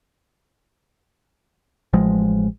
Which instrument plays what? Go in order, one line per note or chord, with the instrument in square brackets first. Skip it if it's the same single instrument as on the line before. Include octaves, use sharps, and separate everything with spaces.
[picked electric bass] A1 F3 G#3